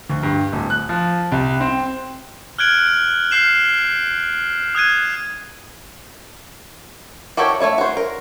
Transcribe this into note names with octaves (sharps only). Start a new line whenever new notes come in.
D2
G2
D1
F#6
F3
C2
C4
F6 F#6 G#6 D7 F#7
F6 G6 C7 E7 F#7
D#6 F#6 G#6 D#7
F#4 G4 A4 A#4 C#5
A3 D#4 C#5 E5
F#4 C5
A#4